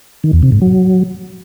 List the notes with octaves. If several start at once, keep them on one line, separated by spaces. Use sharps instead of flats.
D#3
E2
C3
G#2
F#3